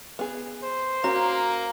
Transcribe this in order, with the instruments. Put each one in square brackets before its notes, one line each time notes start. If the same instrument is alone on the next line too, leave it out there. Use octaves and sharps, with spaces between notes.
[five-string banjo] B3 G#4
[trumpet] C5
[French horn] A#3 [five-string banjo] C#4 F#4 [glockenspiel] A#5